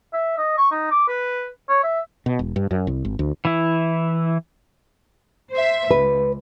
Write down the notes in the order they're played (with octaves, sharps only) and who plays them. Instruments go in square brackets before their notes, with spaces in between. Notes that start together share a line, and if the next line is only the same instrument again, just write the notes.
[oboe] E5
D#5
C#6
D#4
D6
B4
C#5
E5
[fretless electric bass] B2
E1
G2
F#2
C2
G#1
D2
[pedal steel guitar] E3 E4
[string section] C5 E5
[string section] C#2 [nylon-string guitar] B4